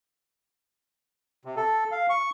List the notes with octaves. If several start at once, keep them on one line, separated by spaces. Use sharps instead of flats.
C3
A4
F5
C#6